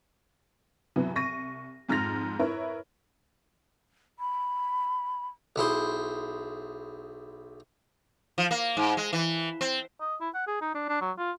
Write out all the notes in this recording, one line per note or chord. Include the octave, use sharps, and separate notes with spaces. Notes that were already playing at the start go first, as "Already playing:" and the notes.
C2 E3 F#3 B3
C2 C#6 A#6 D#7
F2 G#2 F6 A6 A#6 F7
E4 A#4 B4 C#5 E5
B5
B1 E4 G#4 C5
F3
A#3
G#2
G#3
E3
C4
D#5
E4
F#5
G#4
D#4
D4
D4
F#3
F4